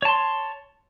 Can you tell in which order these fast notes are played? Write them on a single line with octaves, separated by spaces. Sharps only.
C#5 A5 C6